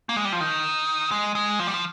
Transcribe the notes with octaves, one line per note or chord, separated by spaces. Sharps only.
A#3
G#3
G3
F3
D#3
G#3
G#3
F3
G3
F3